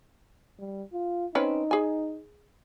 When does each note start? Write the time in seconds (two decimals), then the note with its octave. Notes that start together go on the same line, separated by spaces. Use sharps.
0.59 G3
0.93 F4
1.35 C4 C#4 D#4 B4
1.71 G#4 G#5